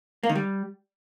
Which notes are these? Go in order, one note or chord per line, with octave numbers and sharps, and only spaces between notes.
A#3
D#3
G3